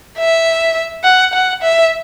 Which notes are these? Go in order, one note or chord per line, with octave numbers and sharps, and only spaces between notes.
E5
F#5
F#5
E5